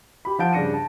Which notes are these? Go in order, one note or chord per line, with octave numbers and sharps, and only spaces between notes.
G4 B5
F3 F5 F#5 A5 G6 D7
G2 C#3 D4 A#6 C#7 D#7
A5